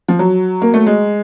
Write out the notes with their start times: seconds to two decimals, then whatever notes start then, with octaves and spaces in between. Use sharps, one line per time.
0.09 F3
0.19 F#3
0.62 A#3
0.74 A3
0.87 G#3